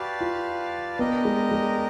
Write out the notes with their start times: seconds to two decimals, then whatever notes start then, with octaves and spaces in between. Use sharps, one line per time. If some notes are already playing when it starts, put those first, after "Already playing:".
Already playing: F#4 G4 B4 D5 F5 A5
0.21 F4
0.99 B3 D4 G4 A#4 D#5
1.25 G#3
1.51 G#3